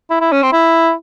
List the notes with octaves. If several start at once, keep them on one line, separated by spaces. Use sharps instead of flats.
E4
E4
C#4
C4
E4